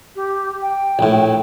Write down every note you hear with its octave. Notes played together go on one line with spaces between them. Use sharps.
G4
G5
A#1 A2